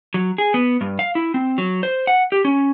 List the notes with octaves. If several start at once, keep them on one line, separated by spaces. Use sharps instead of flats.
F#3
G#4
B3
G2
F5
E4
C4
F#3
C5
F#5
G4
C#4